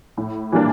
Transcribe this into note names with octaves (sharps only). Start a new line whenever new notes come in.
A2
E3 G3 A#3 D4